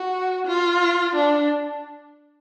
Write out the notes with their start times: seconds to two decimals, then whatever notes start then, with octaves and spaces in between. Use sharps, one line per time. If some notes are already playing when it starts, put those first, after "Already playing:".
Already playing: F#4
0.45 F4
1.15 D4